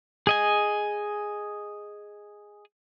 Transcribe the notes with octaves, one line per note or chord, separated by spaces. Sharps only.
G#4 D#5 G#5